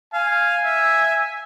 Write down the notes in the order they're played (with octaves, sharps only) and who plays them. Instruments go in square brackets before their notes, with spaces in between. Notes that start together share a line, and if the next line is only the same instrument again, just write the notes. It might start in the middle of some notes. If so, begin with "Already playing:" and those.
[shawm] F5 [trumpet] G#5
[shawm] E5